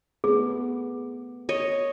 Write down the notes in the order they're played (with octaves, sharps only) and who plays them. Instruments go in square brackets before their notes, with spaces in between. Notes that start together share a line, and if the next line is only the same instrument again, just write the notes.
[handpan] A3 B3 [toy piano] G#4
[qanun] C#5 D#5